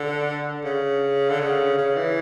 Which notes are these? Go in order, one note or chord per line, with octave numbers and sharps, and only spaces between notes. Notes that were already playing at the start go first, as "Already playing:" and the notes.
Already playing: D3
C#3
D3
C#3
C#3
E3